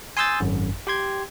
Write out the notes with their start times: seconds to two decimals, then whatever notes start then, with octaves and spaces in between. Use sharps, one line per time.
0.17 G#5 C6 D#6 E6 G6 A6
0.40 G#1 F#2
0.87 G4 G5 C6 G#6